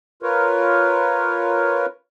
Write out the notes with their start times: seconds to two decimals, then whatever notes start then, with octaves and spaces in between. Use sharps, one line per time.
0.23 F4 A#4 B4 C#5